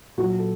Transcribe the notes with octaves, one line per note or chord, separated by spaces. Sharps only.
A#2 F#3 F#4
A4